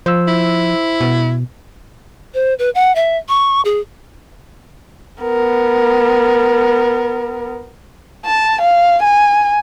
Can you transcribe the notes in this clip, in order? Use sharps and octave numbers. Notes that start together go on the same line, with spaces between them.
F3 C5 E6
E4
B2
C5
B4
F#5
E5
C#6
G#4
B3 A#4
A5
F5
G#5